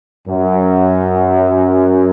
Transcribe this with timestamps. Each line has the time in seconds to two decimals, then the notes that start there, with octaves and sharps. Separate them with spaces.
0.27 F#2